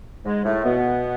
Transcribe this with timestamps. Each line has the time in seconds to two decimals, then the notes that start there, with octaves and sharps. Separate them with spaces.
0.25 G#2 G#3
0.44 A2 A3
0.64 B2 B3